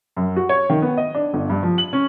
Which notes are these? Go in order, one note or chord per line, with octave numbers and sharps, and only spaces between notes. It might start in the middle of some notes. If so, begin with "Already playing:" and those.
F#2
F#4
C#5
D#3
B3
D#5
D4
G1
G2
F3
F#7
C#4